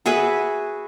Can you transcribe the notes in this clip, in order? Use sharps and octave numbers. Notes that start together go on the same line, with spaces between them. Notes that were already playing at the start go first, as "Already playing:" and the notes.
F#4 G#4 B4 E5